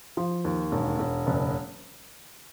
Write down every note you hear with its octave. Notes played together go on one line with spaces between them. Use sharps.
F3
D#2
E1
E1
F#1